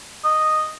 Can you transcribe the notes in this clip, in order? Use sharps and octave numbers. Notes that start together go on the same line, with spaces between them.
D#5